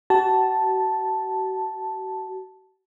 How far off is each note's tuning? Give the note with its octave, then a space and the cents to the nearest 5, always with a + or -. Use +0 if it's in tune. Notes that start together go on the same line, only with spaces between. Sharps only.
F#4 +35 A5 +0